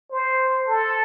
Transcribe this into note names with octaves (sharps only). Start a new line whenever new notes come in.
C5
A4